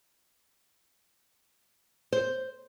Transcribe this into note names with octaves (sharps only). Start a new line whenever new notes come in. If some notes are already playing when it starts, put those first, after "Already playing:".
C5